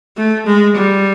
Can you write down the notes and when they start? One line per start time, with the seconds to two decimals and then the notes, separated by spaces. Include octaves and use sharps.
0.17 A3
0.47 G#3
0.76 G3